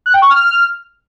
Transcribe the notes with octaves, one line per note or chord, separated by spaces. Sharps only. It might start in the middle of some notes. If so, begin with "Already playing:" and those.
F#6
G5
C#6
F6